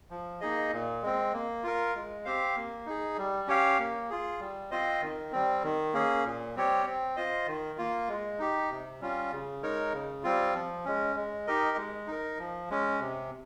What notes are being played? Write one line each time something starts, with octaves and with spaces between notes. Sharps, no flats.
F3
A#3 D#4 G#4 D#5
A#2
G#3 C4
A#3
F4 A#4
G#3
C4 G4 C5 F5
A#3
D#4 G#4
G3
C#4 G4 C#5 F5
A#3
F4 G#4
G3
C4 F4 C5 D#5
D#3
G3 C4
D#3
A#3 C#4 G#4
A#2
G3 C4 G4 C#5
C4
F4 C5 D#5
D#3
A#3 F4
G#3
D#4 G4
C3
G3 C#4 F4
C#3
G#3 D#4 A#4 C#5
C#3
G3 C4 F4
F3
G#3 C#4
G#3
D#4 G4 A#4 D#5
G#3
D#4 A#4
F3
G#3 C#4
C3